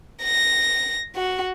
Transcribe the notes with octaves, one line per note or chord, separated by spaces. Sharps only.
A#6
F#4